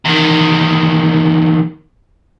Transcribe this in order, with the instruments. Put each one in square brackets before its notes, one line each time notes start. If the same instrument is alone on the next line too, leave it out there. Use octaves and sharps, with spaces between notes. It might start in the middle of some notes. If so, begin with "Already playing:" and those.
[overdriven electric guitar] E2 D#3